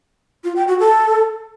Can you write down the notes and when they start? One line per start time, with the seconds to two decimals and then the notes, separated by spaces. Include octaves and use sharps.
0.44 F4
0.56 G5
0.68 F#4
0.79 A4